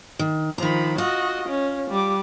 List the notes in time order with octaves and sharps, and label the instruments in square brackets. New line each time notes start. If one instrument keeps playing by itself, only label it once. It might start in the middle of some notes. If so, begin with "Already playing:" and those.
[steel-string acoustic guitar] D#3
[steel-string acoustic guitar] D#3 A#5 [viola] F3 B5
[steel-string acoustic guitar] F4 [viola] F#4 D#5
[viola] C#4
G3 D6